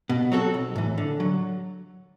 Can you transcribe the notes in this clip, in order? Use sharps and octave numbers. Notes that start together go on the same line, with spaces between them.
B2
F#3 C4 F#4 A4
B1
A2 E3
D3
F#3